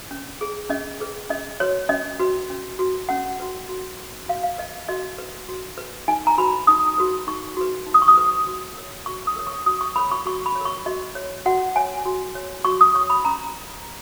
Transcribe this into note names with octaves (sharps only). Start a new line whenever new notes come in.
C#4
G#4 B4
C#4 D#5
G#4 B4
C#4 D#5
F#4 B4 C#5
C#4 D#5
F#4 B4
C#4
F#4 B4
C#4 F#5
F#4 B4
F#4
B4
F#4 F5
F5
B4 D#5
F#4 D#5
B4
F#4
B4
D#4 G#5
A#5
F#4 B4 B5
D#4 D#6
F#4 B4
D#4 C#6
F#4 B4
D#4
D#6
C#6
D#6
F#4 B4
F#4
A#4 C#5
F#4 C#6
D#6
A#4 C#5
C#6
F#4 D#6
C#6
A#4 C#5 B5
C#6
F#4 C#6
B5
C#5
A#4 C#6
F#4 D#5
C#5
F#4 F#5
C#5 G#5
F#4
C#5
F#4 C#6
D#6
C#5 C#6
B5
C#4 A#5